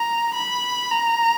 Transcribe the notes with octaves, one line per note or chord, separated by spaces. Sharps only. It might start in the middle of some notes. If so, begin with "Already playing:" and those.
Already playing: A#5
B5
A#5